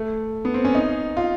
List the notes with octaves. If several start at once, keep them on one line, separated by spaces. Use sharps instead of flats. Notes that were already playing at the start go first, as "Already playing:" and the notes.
Already playing: A3
B3
C4
C#4
D#4
F4